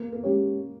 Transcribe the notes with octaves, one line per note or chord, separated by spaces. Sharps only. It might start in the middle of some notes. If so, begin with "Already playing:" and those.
Already playing: A#3
A#3
G#3 C#4 G4 C#5